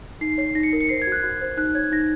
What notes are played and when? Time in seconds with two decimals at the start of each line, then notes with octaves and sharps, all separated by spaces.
0.21 D#4 C7
0.38 C#5 C7
0.55 D#4 A#6
0.63 C#7
0.73 A#4
0.81 C#7
0.89 C5 C7
1.02 G#6
1.07 F#4
1.12 F#6
1.23 F#4
1.41 C5
1.57 D#4 F#6
1.75 C#5 G#6
1.92 D#4 A#6